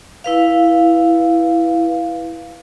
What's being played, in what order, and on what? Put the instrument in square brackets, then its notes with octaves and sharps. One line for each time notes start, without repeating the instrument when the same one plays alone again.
[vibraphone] E4 B4 F5